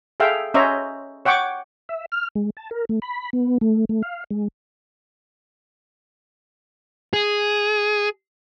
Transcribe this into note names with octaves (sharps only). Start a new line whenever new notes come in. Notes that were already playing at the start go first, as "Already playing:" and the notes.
G#4 A4 E5 F5 G5
C#4 C5 C#5 D#5 E5 A#5
C#5 F#5 G5 C#6 D6
E5
F6
G#3
A5
A#4
A3
B5
B3
A3
A3
F5
G#3
G#4